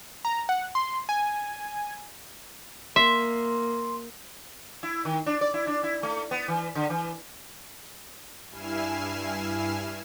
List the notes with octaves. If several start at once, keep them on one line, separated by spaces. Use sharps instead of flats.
A#5
F#5
C6
G#5
A#3 E5 C6
E4
D#3
D4
D5
E4
D4
E4
A3
B3
E3
D3
E3
G2 E4 G#5 F6 C7 E7